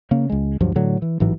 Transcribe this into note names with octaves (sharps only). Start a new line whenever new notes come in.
C#3 A#3
C#2 G#3
D2 G2 F3 F#3
A2 D3 F#3
E3
A1 G#2 E3 F#3